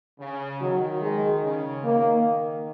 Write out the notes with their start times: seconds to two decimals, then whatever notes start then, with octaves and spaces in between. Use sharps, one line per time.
0.19 C#3
0.60 D#3 F#3
1.02 G#3
1.43 C#3
1.84 D#3 A#3